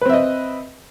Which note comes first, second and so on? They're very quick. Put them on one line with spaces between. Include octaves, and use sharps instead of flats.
B4 C4 E5 D#5